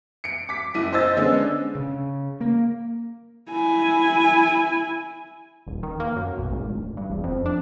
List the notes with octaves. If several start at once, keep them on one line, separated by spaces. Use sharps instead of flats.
C#7 D7
D6 B6
F#1 E4 D#7
C5 D#5 E6 A6
D3 G#3 B3 C#4 D4
C#3
A#3
E4 G#5
D#1
D#3
A#3
F#2
B1
G#1
D1
G2
E1
F2
D4